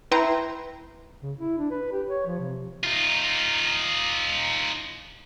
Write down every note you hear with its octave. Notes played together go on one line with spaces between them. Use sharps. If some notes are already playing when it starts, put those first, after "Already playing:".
E4 B4 G5 A#5 C6
C#3
E4
D4
B4
G4
C#5
F3
C3
D#4 F4